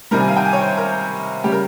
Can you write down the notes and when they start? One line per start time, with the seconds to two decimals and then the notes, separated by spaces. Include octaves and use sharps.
0.11 C3 D#3 G3 A#4
0.20 G#5
0.28 F5
0.37 G5
0.45 G#5
0.53 C#5
0.61 C5
0.78 A#4
1.44 C#3 G3 G4
1.52 A#4